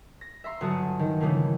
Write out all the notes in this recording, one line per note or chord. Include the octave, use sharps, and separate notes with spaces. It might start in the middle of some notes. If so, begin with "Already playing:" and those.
A#6
E5 A#5 C6
G1 F#3 F#4 A5 D#6
D#3
C#3 E3 F3 G3 A3 A#3